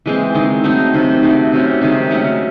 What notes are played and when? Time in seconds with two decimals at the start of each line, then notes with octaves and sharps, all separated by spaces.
0.06 E3 G#3 C4
0.34 D#3 G#3 C4
0.64 F#3 A3 C4 D#4
0.93 C3 D#3 A3 C4
1.23 D#3 A3 C4 F#4
1.52 C3 F#3 A3 C#4
1.81 C3 D#3 G#3
2.11 F#3 A3 C#4